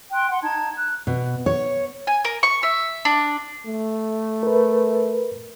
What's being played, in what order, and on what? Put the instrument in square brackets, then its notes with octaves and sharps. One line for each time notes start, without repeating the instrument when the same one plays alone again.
[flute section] G5 C6 F#6
F#5 C6
D#4 A5 G#6
F#6
[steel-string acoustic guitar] B2
C#5
[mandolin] G#5
A#4
C#6
E5
D4
[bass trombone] A3
[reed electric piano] A#4 B4